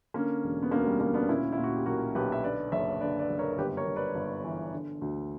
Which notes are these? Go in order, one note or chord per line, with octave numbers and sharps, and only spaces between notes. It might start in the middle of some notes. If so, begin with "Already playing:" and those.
D3 A#3 C#4
E1
B3
D2 A#3 C#4
G3 B3
D2 A#3 C#4
B3 D4
A#2 C#4 E4
E4
A#2
F#4
G4
B1 F#4 A#4
B1 G4 B4
E5
D3 B4 D5
F#1 C#5 E5
D3 B4 D5
B4 D5
F#1
A#4 C#5
A#4
G1 G4 B4
A#4 C#5
G1
B4 D5
G1
E3
D3
D2